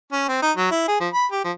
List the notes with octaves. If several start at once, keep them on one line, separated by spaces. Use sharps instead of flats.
C#4
C4
D#4
F#3
E4
G#4
F3
B5
G4
F3